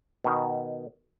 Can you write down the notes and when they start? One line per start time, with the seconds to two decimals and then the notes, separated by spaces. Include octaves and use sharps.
0.24 B2 D#3